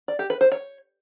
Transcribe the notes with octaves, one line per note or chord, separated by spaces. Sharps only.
D5
G4
B4
C5
C#5